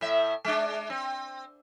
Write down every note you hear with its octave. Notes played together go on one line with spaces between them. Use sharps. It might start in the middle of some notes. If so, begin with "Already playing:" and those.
A2 E5
G#3 D4
C4